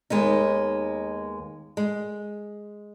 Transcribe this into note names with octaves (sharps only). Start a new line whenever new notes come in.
D#2 G#3 B3 D#4
G#3